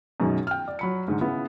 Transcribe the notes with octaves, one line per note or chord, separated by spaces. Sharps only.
F#2 B2 D#3 G#3
G5 F6
D5
F#3 B5 C#7
G#2 D3 D#3
C#3 B3 E4